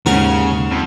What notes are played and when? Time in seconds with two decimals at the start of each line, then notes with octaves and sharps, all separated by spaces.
0.06 D#2 G#2 C#3 A#4 F#5 G#5
0.71 F2